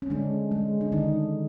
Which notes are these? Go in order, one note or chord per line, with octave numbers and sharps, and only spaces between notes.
C#4
D3 G#3 D4
G#3
D4
D3 D#3 D#4